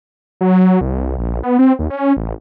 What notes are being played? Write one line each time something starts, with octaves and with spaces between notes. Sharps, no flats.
F#3
C2
A#1
B3
C4
D#2
C#4
A1